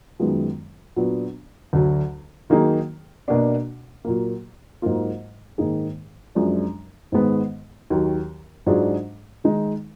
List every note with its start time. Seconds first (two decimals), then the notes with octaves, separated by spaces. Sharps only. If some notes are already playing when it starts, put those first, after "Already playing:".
0.19 F#2 D#3 G#3 B3 F4
0.96 A#2 F#3 B3 D4
1.73 D2 D3 F#3
2.50 D#3 F#3 A#3 D#4 G#4
3.28 B2 A#3 D4 F#4
4.05 A#2 F#3 A#3
4.82 G#2 F#3 A#3 F4
5.58 G#2 D#3 A#3 D#4 G#4
6.35 F#2 F3 G#3 D4
7.12 G#2 D#3 G#3 B3
7.90 D#2 D#3 F#3
8.66 G#2 F#3 D4 F4 G#4
9.44 D#3 G#3 D#4